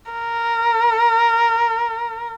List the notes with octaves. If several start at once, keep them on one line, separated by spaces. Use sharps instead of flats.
A#4